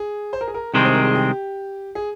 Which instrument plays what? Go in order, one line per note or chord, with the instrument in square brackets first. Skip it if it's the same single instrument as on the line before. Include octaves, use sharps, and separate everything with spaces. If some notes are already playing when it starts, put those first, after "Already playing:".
Already playing: [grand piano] G#4
C5
A#4
G#4
A#4
[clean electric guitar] C2 C3 D#3 G#3 C4 [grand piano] A#4
[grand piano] C5
A#4
G#4
G4
G#4